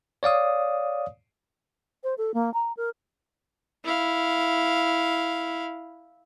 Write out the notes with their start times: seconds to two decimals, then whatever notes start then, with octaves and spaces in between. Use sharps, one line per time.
0.23 C#5 D5 F5 D#6
2.03 C5
2.18 A4
2.34 A#3
2.54 A#5
2.77 A#4
3.84 E4 F5